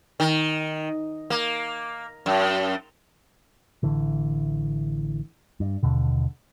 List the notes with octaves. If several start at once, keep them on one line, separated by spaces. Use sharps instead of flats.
D#3
A#3
F#2
A1 D3 E3
G2
D#2 B2 D3